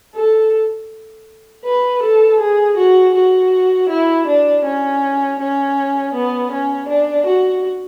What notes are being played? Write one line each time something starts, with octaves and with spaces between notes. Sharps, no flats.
A4
B4
A4
G#4
F#4
F#4
E4
D4
C#4
C#4
B3
C#4
D4
F#4